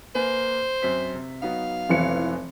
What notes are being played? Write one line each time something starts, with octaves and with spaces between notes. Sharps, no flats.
A#3 B4 C5 G#5
F#2 C4 B6
C3
F#3 B3 D#4 F5
F1 E3 C#7